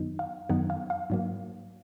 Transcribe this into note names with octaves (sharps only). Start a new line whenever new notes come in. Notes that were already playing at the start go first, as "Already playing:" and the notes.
Already playing: F#2 D#3 F#3 B3 D#4
F5
F#2 D#3 F#3 B3 D#4 F#5
F5
F5
G#2 F#3 A#3